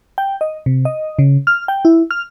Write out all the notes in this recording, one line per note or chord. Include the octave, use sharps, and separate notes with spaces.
G5
D#5
C3
D#5
C#3
F6
G5
E4
F6